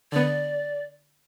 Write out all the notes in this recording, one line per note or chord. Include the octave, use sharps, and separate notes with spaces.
D3 B3 D5